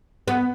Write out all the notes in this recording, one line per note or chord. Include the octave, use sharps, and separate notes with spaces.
B3